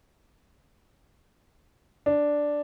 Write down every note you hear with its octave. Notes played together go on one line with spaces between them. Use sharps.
D4